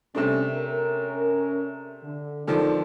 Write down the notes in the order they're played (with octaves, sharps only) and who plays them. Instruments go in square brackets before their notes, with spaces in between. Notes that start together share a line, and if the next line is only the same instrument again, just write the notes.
[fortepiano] C3 A3 D4 [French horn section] G3 C#4
[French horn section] C#4 A#4
D3
[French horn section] F2 G#2 D5 [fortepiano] D3 D#3 F3